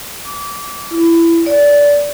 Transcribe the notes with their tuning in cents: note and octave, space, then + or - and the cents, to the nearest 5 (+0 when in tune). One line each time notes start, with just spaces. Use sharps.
D6 -25
E4 +20
D5 -20